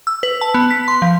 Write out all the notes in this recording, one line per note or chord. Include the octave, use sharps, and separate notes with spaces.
E6
B4
A5
B3
B6
C6
F3